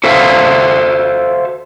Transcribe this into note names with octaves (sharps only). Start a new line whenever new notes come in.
F#4 A4 C5 E5 F5